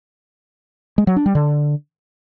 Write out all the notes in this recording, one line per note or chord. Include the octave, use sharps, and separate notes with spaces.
G#3
F#3
D4
G3
D3